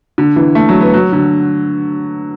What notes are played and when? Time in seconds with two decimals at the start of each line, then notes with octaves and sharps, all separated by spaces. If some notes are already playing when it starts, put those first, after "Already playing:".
0.18 D3
0.36 E3
0.55 A3
0.69 F#3
0.81 B3
0.94 F#3
1.12 D3